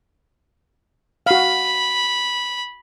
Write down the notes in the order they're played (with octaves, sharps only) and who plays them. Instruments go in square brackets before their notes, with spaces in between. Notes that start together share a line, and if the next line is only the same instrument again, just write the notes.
[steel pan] F#4 F5 [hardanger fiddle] B5